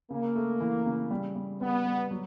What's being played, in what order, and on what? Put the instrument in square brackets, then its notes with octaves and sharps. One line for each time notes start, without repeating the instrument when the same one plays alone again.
[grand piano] C#3 [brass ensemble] A#3
[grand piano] A3
E3
C#3
G3
G3
[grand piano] G3 [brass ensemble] B3
[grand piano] G3
F#3